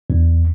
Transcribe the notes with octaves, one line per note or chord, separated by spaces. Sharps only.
E2